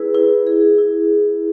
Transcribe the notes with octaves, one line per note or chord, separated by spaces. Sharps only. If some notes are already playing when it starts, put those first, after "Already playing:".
Already playing: E4 G#4 B4
E4
G#4
E4